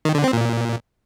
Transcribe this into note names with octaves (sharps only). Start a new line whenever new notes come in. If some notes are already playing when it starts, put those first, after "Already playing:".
D#3
D3
C4
A#2